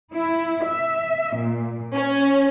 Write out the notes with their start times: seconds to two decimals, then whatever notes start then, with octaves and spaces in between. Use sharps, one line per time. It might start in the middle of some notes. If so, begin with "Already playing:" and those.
0.14 E4
0.67 E5
1.36 A#2
1.95 C#4